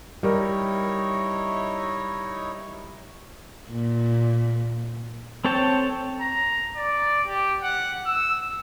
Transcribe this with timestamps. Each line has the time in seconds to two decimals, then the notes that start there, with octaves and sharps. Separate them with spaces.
0.23 G3 D#4 E4 A#4 C#5
3.70 A#2
5.45 C4 A4 C#5 G5 A5
6.21 A#5
6.76 D5
7.26 G4
7.63 F#5
8.06 E6